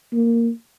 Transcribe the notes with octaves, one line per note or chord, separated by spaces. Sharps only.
A#3